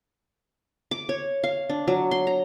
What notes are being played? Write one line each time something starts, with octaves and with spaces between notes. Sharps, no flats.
D6
C#5
F5
D4
F#3
C6
A#5